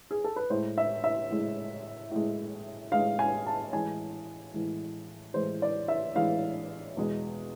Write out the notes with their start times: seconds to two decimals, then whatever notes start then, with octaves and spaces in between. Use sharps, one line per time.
0.11 G#4
0.24 A4
0.36 B4
0.50 A2 G#3 C5
0.78 E5
1.04 E5
1.30 A2 G#3
2.11 A2 G#3
2.92 A2 G#3 F5
3.19 G#5
3.46 A5
3.73 A2 E3 G#3 G#5
4.54 A2 E3 G#3
5.34 A2 E3 G#3 C5
5.62 D5
5.88 E5
6.15 A2 E3 G#3 F5
6.97 E2 B2 G#3